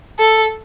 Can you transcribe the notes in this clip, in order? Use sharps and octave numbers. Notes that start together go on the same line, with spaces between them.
A4